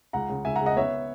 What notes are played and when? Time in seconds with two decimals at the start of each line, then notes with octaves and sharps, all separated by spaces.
0.13 C#2 F#5 A#5
0.29 C#3
0.45 C#2 E5 G#5
0.56 F#5 A#5
0.60 C#3
0.66 D#5 F#5
0.76 B3 C#5 E5